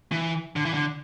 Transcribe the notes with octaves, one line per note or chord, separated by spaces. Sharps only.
E3
D3
E3
D3